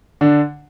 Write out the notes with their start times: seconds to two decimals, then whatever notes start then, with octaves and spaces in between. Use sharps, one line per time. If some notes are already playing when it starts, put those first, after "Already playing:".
0.21 D3 D4